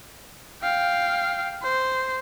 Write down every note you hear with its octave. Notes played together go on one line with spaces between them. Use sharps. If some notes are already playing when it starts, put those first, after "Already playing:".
F5 G5
C5